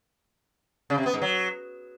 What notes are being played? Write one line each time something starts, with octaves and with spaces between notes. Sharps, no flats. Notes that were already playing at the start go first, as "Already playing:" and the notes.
C#3
C3
B3
G#2
F#3